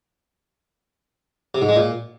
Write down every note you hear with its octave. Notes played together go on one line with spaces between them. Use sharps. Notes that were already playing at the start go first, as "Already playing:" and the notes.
C3
G#2
G#3
A#2